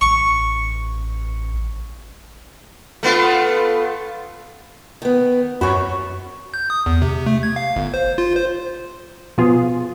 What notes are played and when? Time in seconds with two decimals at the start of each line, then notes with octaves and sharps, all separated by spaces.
0.01 A1 C#6
3.03 A3 B3 F4
5.02 D#3 B3
5.61 F#2 F#4 C#5 B5 C#6
6.54 G6
6.70 D#6
6.86 E2
7.02 C3
7.26 A3
7.43 G#6
7.56 F5
7.76 G1
7.94 C5
8.18 F4
8.36 C5
9.38 B2 F3 B3 F4 G#4